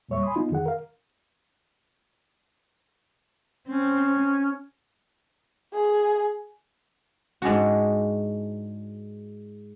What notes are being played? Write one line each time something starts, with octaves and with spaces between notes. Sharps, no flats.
E2 A#2 G3 C#5 E5 C#6
G#5 B5 C6 D#6
B3 D#4 F4
F2 D#3 G#4 F#5
A#4 F5
C4 C#4
G#4
G#2 G#3 D4 F#4